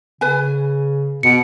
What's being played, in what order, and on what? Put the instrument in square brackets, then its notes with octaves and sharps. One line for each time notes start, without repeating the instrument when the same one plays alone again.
[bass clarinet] C#3 [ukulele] B4 G#5
[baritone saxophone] B2 [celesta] C#7 D7